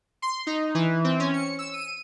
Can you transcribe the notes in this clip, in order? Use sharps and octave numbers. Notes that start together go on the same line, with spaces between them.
C6
D#4
E3
C4
C#4
C#7
E6
D#7